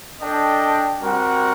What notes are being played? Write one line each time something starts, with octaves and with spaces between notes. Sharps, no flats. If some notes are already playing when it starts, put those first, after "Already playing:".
D4 A4 D#5 G5
G3 C4 F#4 A#4 F#5